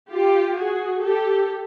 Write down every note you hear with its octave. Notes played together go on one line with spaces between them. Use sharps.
F4 G4
F#4 G#4
G4 A4